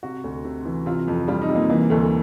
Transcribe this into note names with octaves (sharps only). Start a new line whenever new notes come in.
C3 F#4
D2
C3
E3
C3 F4
F2
G3 F4
D#4
C3
A#3
E3 A#3
D2 A3